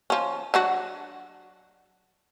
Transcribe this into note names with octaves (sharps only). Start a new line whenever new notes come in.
F3 C#4
F#3 D4 F#4